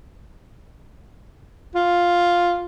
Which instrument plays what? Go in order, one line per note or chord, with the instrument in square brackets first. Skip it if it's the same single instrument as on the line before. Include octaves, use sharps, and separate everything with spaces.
[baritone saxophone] F4